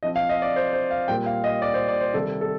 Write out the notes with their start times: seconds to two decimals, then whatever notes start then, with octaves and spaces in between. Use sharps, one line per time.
0.03 F3 C4 F4 D#5
0.16 F5
0.29 D#5
0.42 D5
0.56 C5
0.73 C5
0.91 F5
1.08 A#2 G3 A#3 G5
1.26 F5
1.44 D#5
1.62 D5
1.74 C5
1.88 D5
2.00 C5
2.14 C3 D#3 G3 A4
2.41 A4